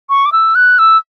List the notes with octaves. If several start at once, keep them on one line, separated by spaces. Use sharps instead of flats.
C#6
D6
E6
F#6
E6